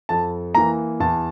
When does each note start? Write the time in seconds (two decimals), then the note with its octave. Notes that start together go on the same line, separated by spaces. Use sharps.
0.09 F2 A5
0.55 E3 A#3 A#5
1.00 E2 A5